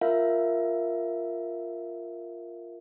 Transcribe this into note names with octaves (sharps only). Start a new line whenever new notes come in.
F4 A#4 E5 F5